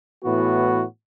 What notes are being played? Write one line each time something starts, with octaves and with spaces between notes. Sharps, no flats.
A2 E3 B3 F#4